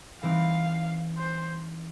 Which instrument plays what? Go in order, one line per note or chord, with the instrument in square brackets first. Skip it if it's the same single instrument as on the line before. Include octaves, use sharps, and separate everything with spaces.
[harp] E3 G3 C4 D#4 [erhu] F5
[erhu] C5